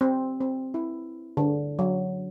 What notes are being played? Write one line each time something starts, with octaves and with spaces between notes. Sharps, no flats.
C4
C4
E4
D3
F#3